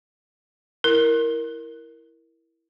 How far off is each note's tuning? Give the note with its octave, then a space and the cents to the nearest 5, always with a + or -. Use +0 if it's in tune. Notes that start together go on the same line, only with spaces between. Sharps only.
E4 +0 A#4 +0